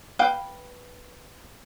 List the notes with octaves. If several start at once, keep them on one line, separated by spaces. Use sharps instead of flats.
B4 F5 G5